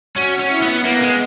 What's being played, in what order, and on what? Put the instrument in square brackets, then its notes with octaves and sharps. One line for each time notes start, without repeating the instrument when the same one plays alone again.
[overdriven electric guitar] C#4 [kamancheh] F#4
[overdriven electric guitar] C#4
[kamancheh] E4
[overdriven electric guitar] B3
[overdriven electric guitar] A#3 [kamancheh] B3
[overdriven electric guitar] G#3